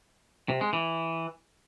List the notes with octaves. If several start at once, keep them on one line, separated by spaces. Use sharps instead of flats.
C3
G#3
E3